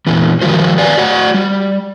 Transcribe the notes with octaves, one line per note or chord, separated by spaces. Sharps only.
A#2 E3 B3
D#3 F3 G3 F#4 C5
B4 C#5 D5 F5 G#5
F#4 C#5 D5 F#5
G3